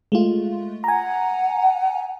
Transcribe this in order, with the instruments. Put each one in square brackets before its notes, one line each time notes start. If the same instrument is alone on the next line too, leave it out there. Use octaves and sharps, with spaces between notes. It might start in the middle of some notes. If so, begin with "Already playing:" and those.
[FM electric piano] G#3 A3 F4
[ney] F#5 [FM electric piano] G#5 A#5